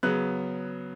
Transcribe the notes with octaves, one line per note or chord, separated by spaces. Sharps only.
C#3 F#3 B3 F#6